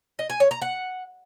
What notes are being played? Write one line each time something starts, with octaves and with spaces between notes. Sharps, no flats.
D#5
G#5
C#5
A#5
F#5